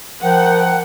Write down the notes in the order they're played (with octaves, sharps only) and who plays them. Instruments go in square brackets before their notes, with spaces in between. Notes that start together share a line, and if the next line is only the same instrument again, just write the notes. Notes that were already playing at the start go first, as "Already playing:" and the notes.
[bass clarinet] F3 [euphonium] A#4 [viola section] F#5 [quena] G5